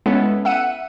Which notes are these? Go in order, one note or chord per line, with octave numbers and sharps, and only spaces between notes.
G#3 B3 C#4 E4 A4
E5 F#5 C#7 D#7